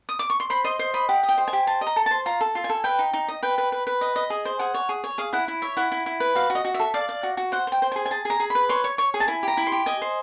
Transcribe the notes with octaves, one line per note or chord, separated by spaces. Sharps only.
D#6
D6
C#6
C6
C5 B5
D#5 C6
C5
D#5 B5
G4 F#5
D#5
G5
C5
G#5
G4
C5 A5
D#5
A#5
A4
C5 A5
F4 A#5
A4
F4
G#5
A4
B4 G5
D#4
D#4
D#5
B4 G5
B4
B4
B4
D#5
D#5
G#4
C5
G#4 F#5
C#5
G#4
C#5
G#4 F5
E4 F#5
E4
C#5 E5
E4 F#5
E4
E4
B4
F#4 F5
F#4
D#5
F#4
E5
A4
D5 F5
D5
F#4
F#4
C5 F#5
C5 G5
C5
G#4 G#5
G#5
G#4 A5
G#4 A#5
G#4
B4 B5
C#5 C6
C#5 C#6
C#5 C#6
G#4
A5
E4 G#5
G4 A#5
E4
C6
G4
D#5 G#5
C5